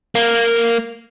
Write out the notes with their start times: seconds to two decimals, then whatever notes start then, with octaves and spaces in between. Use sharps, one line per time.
0.15 A#3